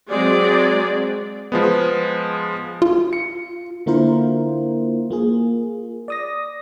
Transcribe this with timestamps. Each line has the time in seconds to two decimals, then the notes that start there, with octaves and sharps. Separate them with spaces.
0.11 F#3 G#3 C4 G#4 D5
1.52 F3 G#3 B3
2.82 F4
3.13 C#7
3.86 D3 A#3 E4 F4 A#4 C5
5.11 A#3 F4 G#4
6.08 D5 D#6 A#6